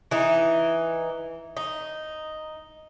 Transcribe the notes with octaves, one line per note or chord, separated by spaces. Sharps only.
E3 D#4
D#4